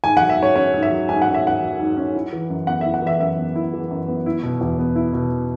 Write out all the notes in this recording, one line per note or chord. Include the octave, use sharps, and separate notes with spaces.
G#2 G#5
F#3 F#5
E5
G#2 C#5
C#4 C#5
G#2
E5
F#3
G#2 G#5
F#5
C#4
E5
G#2 F#5
F#3
G#2
C#4
E4
E3
F#2
B3 F#5
E4 E5
F#5
E3 E5
F#2 E5
B3
E4
E3
F#2
B3
E4
B2
E2
B3
E4
B2